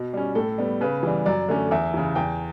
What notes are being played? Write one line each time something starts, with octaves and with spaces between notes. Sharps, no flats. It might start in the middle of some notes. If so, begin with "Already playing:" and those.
Already playing: B2
G3 C#4
A2 A4
G3 B3
C#3 B4
E3 G3
F#2 D5
D3 A3 C#4
E2 E5
C#3 E3
E2 G5